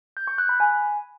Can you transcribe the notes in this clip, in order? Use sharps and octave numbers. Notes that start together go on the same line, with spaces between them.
G6
C#6
F#6
B5
G#5